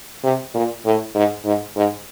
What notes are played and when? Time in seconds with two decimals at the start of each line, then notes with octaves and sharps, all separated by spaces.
0.23 C3
0.54 A#2
0.85 A2
1.15 G#2
1.45 G#2
1.76 G#2